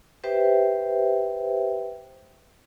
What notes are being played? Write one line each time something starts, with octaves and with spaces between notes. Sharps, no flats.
G4 B4 C5 E5 G5